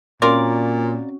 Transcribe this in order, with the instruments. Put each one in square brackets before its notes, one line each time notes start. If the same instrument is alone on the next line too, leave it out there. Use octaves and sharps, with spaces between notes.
[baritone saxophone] A#2 [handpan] C4 C#4 F#4 [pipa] F4 A#4 D5